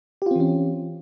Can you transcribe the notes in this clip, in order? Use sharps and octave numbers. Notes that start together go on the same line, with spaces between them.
E3 C4 C#4 F4 G4